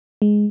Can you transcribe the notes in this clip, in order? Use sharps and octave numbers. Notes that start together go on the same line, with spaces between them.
G#3